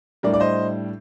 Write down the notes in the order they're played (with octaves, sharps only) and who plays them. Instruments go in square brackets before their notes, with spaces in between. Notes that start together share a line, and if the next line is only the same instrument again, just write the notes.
[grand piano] A2 G3 D4 A#4 D5
D5
C5 D#5